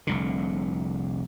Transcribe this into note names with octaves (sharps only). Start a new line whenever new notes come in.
F1 C2 D3